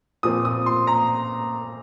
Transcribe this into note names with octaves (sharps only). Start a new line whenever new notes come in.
A#2 F3 C4 D#6
D#6
C6
A#5